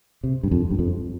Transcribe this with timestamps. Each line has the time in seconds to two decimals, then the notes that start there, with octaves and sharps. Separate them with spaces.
0.24 C3
0.43 G2
0.51 F2
0.70 G2
0.79 F2